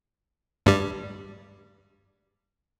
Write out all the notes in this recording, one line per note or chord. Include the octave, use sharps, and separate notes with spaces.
G2 G3